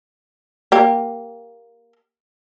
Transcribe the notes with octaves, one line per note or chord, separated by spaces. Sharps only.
A#3 G4